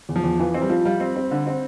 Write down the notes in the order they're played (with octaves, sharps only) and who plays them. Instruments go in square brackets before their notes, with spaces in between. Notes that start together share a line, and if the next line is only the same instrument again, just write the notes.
[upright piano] E2
[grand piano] F3
[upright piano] E2
[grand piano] E3 [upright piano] F4
[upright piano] C4
[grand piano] G3
[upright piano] F3
[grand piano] G3 [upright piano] F4
[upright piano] C4
C4
D3
C4